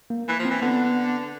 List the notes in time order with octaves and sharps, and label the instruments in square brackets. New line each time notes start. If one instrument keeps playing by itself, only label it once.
[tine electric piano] A#3
[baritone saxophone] E3
F3
[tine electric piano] C4
[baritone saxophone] E3
[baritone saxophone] D3 [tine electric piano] B3